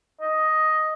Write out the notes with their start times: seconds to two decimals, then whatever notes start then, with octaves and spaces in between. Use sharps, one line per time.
0.21 D#5